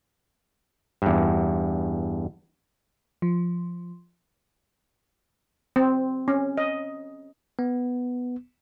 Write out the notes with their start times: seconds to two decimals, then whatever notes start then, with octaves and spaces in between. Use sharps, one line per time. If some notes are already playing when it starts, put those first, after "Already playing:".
1.02 E2 G2
3.22 F3
5.76 C4
6.28 C#4
6.58 D#5
7.59 B3